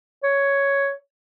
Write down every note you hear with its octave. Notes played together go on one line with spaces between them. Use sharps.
C#5